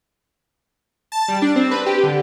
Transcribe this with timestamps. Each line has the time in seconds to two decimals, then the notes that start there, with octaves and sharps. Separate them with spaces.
1.12 A5
1.28 G3
1.42 D4
1.56 C4
1.71 B4
1.86 G4
2.03 D3